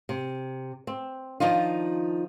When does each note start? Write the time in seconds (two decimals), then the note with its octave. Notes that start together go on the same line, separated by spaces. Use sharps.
0.09 C3
0.87 C4
1.40 D#3 F3 D4 D#4 F4